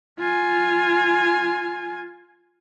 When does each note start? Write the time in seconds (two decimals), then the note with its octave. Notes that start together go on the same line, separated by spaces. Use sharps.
0.19 F4 G#5